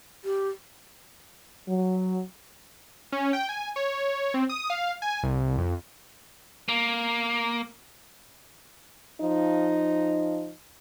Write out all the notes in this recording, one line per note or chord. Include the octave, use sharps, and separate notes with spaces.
G4
F#3
C#4
G5
G#5
C#5
C4
D#6
F5
G#5
C2
F2
A#3
F3 D#4